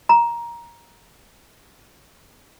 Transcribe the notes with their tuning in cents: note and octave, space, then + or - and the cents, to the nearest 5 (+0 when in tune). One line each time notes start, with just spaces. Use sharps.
A#5 +15